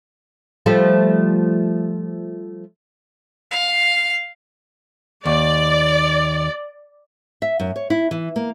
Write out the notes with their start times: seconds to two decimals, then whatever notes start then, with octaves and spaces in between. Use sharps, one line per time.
0.66 F3 G3 A3
3.51 F5
5.26 D#2 D5
7.42 E5
7.60 F#2
7.76 C#5
7.90 E4
8.11 E3
8.36 A#3